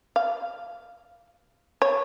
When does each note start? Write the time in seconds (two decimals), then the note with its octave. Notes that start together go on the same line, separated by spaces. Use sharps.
0.16 F5
1.82 C#5